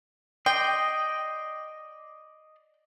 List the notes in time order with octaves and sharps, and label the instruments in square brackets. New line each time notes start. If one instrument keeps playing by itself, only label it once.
[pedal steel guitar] D5 D#5 C6 [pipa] G5